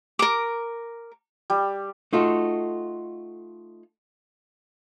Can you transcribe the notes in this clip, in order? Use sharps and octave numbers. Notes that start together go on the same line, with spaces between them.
A#4 D6
G3
A3 D#4 F4 F#4 A4